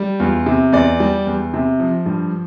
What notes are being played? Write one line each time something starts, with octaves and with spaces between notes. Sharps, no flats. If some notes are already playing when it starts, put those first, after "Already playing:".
Already playing: G3
E2 F4
C3
E2 D5
G3
E2
C3
F3
G2